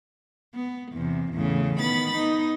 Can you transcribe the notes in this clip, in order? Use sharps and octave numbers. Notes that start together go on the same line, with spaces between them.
B3
E2 C3
E2 A2 C#3
D#3 B3 B5 A6
B3 D#4